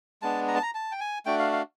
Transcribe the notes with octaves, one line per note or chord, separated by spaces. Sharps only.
G#3 B3 D4 A5
A#5
A5
A#5
A5
G5
G#5
A3 D4 F#4 G5
F5
F5